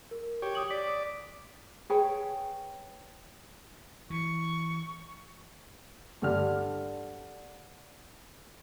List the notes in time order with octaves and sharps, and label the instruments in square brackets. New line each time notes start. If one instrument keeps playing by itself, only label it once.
[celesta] A#4
[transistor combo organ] G4 C#5
[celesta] D6 D#6 F#7
[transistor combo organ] D5 [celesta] B6
[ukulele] G#4 B4 C#5 G5
[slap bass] E3 [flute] C#6
[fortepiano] G2 D3 F6